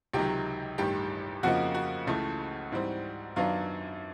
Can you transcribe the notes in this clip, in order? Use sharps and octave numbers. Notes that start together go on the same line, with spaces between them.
C#2 C3 D#3 F#3 G4 G5
A1 G2 D#3 G4 G5
F2 C#3 F3 A#3 D#4 F#4 F#5
F#4 F#5
C#2 C#3 E3 A3
G#2 E3 G3 C4
F#2 D#3 F#3 B3 D4 F4 F5